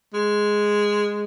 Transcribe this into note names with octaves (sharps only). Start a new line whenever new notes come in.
G#3